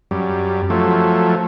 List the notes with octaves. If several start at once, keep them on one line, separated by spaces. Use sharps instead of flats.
F#2 G3
F3 F#3 A3